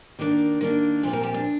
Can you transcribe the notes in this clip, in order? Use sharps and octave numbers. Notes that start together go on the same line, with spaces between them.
D#3 A#3 D4 D5
D#3 A#3 D4
A#2 F3 C4
A#4
G4
D4